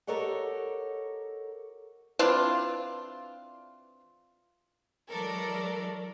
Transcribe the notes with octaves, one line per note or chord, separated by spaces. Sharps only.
G4 A4 A#4 C#5 D#5 F#5
E3 C4 D4 F4
E3 F#3 G#3 A4 A#4 D5